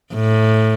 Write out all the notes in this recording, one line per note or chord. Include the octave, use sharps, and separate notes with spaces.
A2